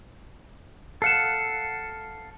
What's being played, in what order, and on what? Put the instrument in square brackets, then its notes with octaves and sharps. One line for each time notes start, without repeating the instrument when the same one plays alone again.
[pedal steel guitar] A4 F5 F#5 [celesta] C7 C#7 E7